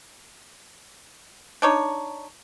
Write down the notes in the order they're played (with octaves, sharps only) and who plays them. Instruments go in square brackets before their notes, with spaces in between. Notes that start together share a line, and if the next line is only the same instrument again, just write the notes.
[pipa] D4 D#4 C#5